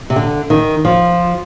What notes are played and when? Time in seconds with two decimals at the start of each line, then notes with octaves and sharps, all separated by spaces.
0.10 C3
0.16 D3
0.50 D#3
0.85 F3